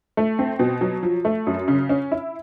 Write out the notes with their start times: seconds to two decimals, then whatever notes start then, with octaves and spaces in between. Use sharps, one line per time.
0.17 A3
0.39 C4
0.59 B2
0.81 F#3
1.03 F3
1.25 A3
1.47 F#2
1.68 C#3
1.89 C#4
2.12 E4